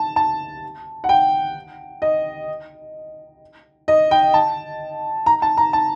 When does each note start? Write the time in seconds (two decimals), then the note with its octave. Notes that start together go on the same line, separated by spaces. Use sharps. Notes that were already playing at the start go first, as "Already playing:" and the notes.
Already playing: A5
0.16 A5
1.04 F#5
1.09 G5
2.02 D#5
3.88 D#5
4.11 G5
4.34 A5
5.26 A#5
5.42 A5
5.57 A#5
5.73 A5